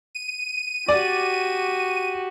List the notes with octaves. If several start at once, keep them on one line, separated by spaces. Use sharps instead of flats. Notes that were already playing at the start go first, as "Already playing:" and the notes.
D#7
F#4 G4 D5